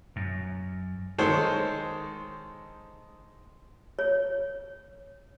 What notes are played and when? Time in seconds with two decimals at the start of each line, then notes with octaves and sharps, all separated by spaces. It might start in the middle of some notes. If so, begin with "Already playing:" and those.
0.16 F#2
1.18 D#3 G#3 A4 C5 C#5
3.99 C#5